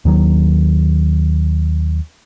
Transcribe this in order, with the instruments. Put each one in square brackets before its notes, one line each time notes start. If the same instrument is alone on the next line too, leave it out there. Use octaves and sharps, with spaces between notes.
[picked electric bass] D#2 D#3 F#3